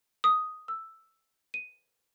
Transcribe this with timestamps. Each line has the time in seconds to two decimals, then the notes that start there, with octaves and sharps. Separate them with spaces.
0.24 D#6
0.68 E6
1.54 D#7